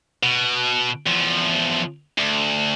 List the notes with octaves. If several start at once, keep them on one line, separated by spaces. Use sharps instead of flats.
B2
E2 F3
D2